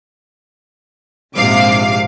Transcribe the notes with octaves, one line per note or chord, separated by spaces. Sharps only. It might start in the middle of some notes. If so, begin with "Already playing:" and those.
A#1 G#2 C3 F5 D6